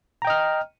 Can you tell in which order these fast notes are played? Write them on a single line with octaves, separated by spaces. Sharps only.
A#5 G5 D#5 F6